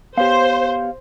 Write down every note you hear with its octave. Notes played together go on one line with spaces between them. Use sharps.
B3 G4 C5 C#5 F5